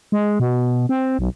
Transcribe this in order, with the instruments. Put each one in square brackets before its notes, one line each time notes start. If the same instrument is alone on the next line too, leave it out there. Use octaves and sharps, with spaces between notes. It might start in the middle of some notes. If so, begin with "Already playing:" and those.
[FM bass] G#3
B2
C4
B1